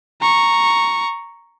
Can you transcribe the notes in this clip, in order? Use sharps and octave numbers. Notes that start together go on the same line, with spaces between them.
A#5 C#6